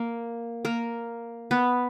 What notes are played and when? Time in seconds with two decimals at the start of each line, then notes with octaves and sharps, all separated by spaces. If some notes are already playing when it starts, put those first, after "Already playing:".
Already playing: A#3 A#4
0.65 A#3 A#4
1.51 B3 B4